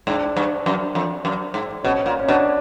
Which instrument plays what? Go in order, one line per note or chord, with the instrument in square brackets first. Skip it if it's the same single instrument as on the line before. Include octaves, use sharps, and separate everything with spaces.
[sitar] G#2 [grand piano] D4
[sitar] G2
F#2
F2
F#2
G#2
[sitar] B2 [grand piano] C#4
[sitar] A#2
[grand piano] C#4
[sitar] B2 [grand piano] D4